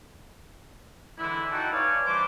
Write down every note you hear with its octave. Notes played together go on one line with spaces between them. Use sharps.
D3 E3 G#3 E4
D#4 F#4 F#5 G5 A5
B4 C#5 D5 F5 G#5
E3 G3 D4 C5 D6